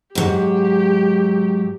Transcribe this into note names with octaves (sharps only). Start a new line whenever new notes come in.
G#2 F#3 G4